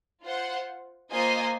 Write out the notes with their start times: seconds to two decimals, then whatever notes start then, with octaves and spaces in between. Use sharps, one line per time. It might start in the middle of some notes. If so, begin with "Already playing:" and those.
0.23 F4 C5 F#5
1.11 A#3 F4 C5 D#5 G#5